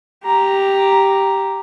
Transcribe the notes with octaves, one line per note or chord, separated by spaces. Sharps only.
G4 A#5